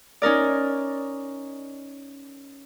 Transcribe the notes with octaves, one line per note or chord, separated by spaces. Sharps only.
C#4 D#4 A#4 D5